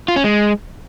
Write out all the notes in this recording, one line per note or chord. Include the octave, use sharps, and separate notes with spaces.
F4
C#4
G#3